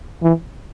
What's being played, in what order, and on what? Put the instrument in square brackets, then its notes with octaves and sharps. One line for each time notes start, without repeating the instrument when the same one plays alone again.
[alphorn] E3